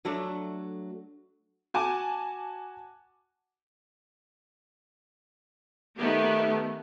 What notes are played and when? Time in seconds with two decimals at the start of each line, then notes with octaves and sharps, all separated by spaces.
0.05 F#3 A3 D4
1.74 F#4 G#5 A5 D6
5.98 D#3 A3 B3 G4